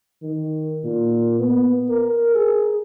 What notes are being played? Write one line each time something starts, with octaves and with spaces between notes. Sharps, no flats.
D#3
A#2
B3
A#4
G#4